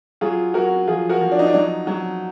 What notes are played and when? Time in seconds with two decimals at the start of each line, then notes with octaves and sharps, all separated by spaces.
0.21 F#3 F4 G#4
0.54 F#3 F#4 A#4
0.87 F3 F4 G#4
1.09 F#4 A#4
1.21 F3
1.32 D4
1.39 D#4
1.47 D4
1.54 F#3 D#4
1.87 F#3